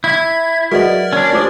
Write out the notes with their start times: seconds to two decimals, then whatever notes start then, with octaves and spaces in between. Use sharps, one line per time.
0.04 E4 G#6
0.71 F#3 F#4 G#4 A#4 B4 D5 D#5 F#5
1.13 C#4 D4
1.33 A3 F4 G4 C5 D6 D#6